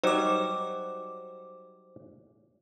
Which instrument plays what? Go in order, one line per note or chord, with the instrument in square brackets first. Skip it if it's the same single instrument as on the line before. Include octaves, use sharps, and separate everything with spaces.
[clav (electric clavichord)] F#3 G3 D#4 [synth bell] C5 D6